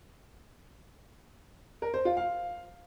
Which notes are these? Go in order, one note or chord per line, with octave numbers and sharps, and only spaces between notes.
A#4
C5
F4
F5